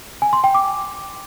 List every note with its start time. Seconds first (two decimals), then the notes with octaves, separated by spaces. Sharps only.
0.22 G#5
0.33 C6
0.44 G5
0.55 D6